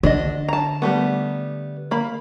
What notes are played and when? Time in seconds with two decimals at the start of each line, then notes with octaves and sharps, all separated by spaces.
0.03 D3 D4 D#5
0.48 A5 A#5
0.82 G3 A3 B3
1.91 A#3 B5